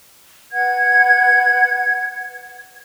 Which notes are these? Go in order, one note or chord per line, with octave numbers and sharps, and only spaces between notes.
B4 F#5 G#6